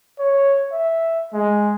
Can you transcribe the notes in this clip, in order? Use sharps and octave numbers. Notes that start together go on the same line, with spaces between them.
C#5
E5
G#3